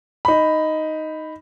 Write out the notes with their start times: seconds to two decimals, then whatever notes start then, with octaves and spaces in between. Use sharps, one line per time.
0.25 D#4 B5